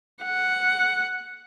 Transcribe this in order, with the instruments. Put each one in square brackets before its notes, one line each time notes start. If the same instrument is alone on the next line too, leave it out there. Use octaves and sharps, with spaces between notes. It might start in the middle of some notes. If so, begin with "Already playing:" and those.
[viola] F#5